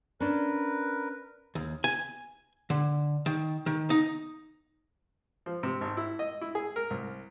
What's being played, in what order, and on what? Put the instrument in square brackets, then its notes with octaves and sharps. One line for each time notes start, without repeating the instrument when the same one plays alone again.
[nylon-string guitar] C#4 D4 [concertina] A#4 B4
[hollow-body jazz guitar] D#2
G#5
D3
D#3
D#3
D#4
[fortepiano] F3
C3
G#1
E4
D#5
E4
G#4
A#4
C2